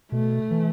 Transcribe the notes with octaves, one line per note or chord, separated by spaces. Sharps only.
B2 A3
E3